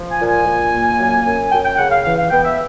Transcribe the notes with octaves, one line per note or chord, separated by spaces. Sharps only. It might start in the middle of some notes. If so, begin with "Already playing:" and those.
Already playing: F3
G#5
A#2
G#5
A#2
A#3
F#2
F#2
F#2 G5
G5
C#3 F#5
F5
E3 F5
F5
B3 G5
E5